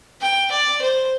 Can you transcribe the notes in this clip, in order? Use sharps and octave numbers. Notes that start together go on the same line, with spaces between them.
G5
D5
C5